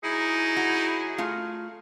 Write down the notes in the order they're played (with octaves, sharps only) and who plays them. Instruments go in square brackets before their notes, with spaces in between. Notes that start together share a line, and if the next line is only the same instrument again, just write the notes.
[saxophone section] F#3 G#4 [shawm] D#4 [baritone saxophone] E4
[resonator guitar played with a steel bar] F#4
A3 F4 F5